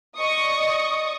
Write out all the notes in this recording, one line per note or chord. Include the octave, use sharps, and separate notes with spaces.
D5 D#5 C#6 D#6